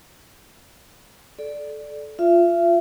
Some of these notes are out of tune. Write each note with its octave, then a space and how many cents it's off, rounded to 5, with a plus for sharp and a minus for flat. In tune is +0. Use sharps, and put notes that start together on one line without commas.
A4 -25 D5 +0
F4 +0 E5 +40